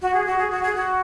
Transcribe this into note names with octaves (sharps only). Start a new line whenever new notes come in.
F#4
G#4
F#4
G#4
F#4
G#4
F#4